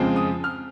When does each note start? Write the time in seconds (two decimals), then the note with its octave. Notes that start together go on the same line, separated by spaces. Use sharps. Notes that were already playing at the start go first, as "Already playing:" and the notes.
Already playing: F2 C#3 F3 G#3 C4
0.16 D#6
0.44 F6